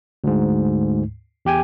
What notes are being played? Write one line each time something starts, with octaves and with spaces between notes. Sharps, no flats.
D2 G#2
E2 G4 G5 G#5